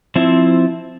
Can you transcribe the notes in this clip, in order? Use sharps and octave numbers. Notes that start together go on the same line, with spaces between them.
F3 C4 E4